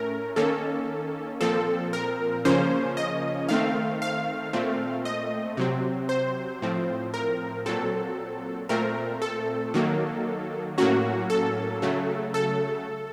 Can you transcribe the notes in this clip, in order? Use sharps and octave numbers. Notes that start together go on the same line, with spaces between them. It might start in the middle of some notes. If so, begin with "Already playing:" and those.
Already playing: A2 A3 C#4 A#4
D#3 A#3 C#4 A4
A#2 F3 C4 A4
A#4
C#3 F3 A#3 C#4 C5
D#5
D#3 A3 C4 F5
F5
A#2 A3 C4
D#5
C3 F#3 C4
C5
A2 F3 C4
A#4
A#2 F#3 C4 A4
A#2 A3 C4 A#4
A4
D#3 F#3 A#3
A2 F#3 A#3 C#4 F#4
A4
C#3 F#3 A3
A4